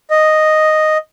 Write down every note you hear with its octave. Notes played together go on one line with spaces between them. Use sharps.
D#5